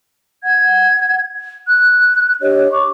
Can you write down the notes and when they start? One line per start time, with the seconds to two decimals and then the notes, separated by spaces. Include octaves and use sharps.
0.43 F#5 G#6
1.68 F#6
2.41 D4 G4 C#5 D#5
2.71 C#6 D6